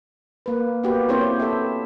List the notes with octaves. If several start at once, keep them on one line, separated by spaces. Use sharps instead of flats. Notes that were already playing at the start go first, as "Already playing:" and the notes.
A#3 B4
A#3 B3 F#4 G4 B4
A#3 C4 E4 G4 C5 C#5
A4 E5